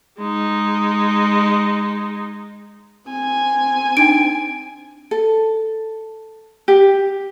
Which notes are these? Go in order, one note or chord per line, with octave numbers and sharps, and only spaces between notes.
G#3 D#4
C4 G#5
D4 D#4 G5 D7
A4
G4